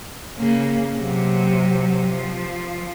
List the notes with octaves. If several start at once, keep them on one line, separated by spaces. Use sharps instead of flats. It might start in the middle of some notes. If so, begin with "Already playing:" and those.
C#3 A#3
C3 F#3
F3